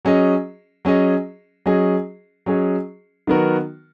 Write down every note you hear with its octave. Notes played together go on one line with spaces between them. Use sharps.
F#3 C#4 G#4 D#5
F#3 C#4 G#4 D#5
F#3 C#4 G#4 D#5
F#3 C#4 G#4 D#5
D#3 F#3 B3 F#4 A#4